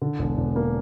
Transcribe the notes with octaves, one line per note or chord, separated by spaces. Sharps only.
D3
E1
E1
A#3